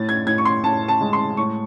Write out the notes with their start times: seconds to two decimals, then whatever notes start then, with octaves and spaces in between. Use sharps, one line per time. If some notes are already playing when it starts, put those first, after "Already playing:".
Already playing: A2 A6
0.09 G#6
0.27 A2 G#6
0.38 C#6
0.45 C6
0.64 A2 A5
0.88 A5
1.01 G#3
1.13 C6
1.37 A2 C#6